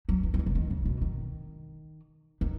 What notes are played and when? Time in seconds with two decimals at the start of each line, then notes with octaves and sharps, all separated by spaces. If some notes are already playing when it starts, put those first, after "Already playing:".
0.09 F#3
0.23 E3
0.34 F#3
0.39 E3
0.46 C#3
0.55 D#3
0.70 C#3
0.85 B2
1.01 D#3
2.41 D#3